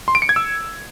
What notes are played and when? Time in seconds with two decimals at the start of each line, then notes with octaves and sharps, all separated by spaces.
0.08 C6
0.15 D7
0.22 C#7
0.29 G#6
0.36 E6